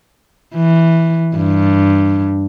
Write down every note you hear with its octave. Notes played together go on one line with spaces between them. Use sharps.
E3
G2